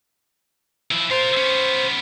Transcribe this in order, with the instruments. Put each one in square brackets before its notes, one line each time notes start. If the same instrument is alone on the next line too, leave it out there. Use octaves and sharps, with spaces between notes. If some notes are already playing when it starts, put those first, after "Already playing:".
[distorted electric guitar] F3 E4
[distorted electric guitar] F4 A#4 [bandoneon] C5
[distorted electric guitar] B3 C#4